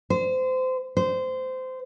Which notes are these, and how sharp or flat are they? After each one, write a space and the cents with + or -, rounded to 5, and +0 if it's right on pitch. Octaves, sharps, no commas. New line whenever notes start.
C5 -25
C5 -20